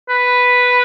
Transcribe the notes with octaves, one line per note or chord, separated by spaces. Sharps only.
B4